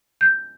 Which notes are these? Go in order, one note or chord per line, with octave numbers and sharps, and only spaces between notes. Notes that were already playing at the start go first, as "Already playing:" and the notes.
G6